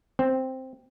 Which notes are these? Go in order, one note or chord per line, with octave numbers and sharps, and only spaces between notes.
C4